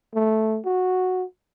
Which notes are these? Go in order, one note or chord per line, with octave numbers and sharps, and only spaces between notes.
A3
F#4